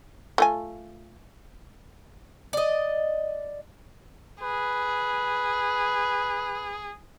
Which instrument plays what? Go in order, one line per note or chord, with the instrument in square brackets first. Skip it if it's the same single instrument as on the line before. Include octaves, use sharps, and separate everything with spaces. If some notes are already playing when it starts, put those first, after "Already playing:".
[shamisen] A3 F4 G#5
[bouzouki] D5 D#5
[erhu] G#4 [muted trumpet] B4